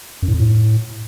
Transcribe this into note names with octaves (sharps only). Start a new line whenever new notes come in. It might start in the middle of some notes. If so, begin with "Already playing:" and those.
F#2
A2
F2
A2